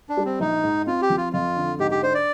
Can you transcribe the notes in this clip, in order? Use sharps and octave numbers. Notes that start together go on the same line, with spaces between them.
D4
G3
C4
A#1 D#4
G#2
C4 F4
G4
F3
F4
F2 F4
D3
G#2 G4
G4
D4 C5
D5